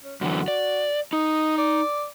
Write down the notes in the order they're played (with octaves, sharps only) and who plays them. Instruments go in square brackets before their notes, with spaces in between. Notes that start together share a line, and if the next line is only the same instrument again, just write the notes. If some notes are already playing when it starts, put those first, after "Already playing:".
[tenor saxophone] C#4
[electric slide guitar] F#2 D3 E3 [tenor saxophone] F#4
[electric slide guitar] D5
[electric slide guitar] D#4 [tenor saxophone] D#5
[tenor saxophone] D5